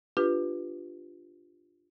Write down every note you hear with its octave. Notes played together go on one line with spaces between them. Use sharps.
D4 F4 G4 B4